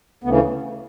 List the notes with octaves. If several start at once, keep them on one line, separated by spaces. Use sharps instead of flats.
D2 C#3 E3 B3